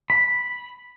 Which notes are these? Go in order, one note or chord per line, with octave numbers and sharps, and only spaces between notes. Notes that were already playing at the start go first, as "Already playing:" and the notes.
B5